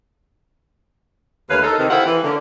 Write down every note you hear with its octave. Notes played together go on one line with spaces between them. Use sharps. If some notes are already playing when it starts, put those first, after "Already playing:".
D#2 D3 A3 B4 C#5 F5
D#4 A4 A#4
C3 D#3
E4 G4 A4 C5 F5 F#5
E3
D3 A#3 C#4